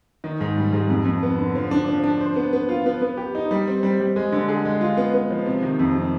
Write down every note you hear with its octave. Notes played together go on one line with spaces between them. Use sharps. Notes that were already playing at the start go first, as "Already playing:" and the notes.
D#3
G#2
G3
G#2
F2
F2
B3
D3
F3
D4
F3
D4
C5
B3
B3
F4
B3
B3
G4
D#4
G3
C4
G3
G3
G#3
D3
G#4
G#3
F4
B3
B3
F3
C3
D#3
F2
C3